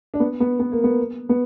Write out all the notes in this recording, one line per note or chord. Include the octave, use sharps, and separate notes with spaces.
D4
B3
B3
B3
A#3
B3
B3